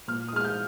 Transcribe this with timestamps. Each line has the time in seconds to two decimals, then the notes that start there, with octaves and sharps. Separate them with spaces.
0.08 A#2 F6
0.28 D#6
0.33 G#3 F6
0.44 G6